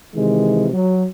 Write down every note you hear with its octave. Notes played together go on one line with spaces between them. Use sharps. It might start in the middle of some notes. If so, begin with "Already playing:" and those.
C3 D#3 E3 G#3
F#3